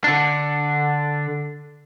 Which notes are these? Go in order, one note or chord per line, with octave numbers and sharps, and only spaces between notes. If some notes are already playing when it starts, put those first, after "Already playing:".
D3 D4